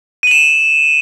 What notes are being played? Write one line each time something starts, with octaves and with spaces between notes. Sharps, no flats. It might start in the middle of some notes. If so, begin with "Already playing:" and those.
D#7 E7 F#7